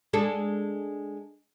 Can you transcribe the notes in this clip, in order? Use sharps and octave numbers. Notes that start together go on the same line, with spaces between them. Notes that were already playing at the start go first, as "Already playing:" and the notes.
G#3 D4 A4